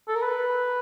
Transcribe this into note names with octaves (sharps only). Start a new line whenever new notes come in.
A4
A#4
B4